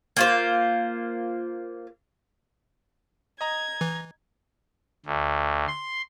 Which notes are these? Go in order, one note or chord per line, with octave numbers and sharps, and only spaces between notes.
A#3 F4 C5
D#5 A#5 G#6
E3
D2
C6